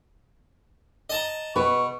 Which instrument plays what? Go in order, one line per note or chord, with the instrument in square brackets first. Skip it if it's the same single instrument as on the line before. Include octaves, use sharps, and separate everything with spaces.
[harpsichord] D#5 A5 A#5
[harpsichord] B2 [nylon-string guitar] B4 [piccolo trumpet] C#6